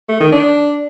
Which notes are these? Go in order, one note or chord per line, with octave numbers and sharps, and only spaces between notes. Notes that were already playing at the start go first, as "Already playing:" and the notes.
A3
D#3
D4